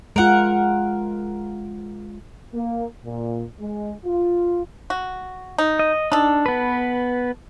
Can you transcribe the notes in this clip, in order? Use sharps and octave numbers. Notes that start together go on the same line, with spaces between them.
G#3 F4 A#4 F#5
A#3
A#2
G#3
F4
F#4
D#4
D#5
D4 D#4 A4
B3 B4